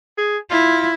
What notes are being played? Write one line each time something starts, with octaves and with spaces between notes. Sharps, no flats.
G#4
E4 F4